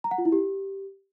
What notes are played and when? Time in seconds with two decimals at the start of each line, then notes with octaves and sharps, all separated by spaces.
0.04 A#5
0.11 F#5
0.18 F4
0.25 E4
0.32 G4